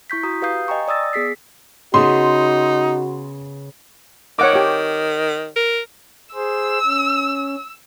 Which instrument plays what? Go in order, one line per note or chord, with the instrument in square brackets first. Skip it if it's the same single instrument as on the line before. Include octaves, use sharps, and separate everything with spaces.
[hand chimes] E4 C#6 G6 B6
F#4 A#5 D#6
G4 B4 F5 D#6 G6 C7
D#5 G5 G#5 A#5 C#6
D5 D#6 E6 A6 A#6
B3 G#4 B6 C7
[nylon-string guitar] C#3 B3 [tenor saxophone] D#4 [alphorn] F#4 [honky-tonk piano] C6
[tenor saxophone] D#3 [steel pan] C#5 F#5 D6
[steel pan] G4 C#5
[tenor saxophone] A#4
[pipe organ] G#4 C5 [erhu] E6
[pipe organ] C#4